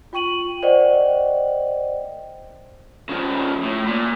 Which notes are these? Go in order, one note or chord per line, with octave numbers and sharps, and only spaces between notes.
F4 G5 C#6 D#7 F#7
A#4 C5 D5 D#5 F#5 G5
C#3 F3
A2
A#2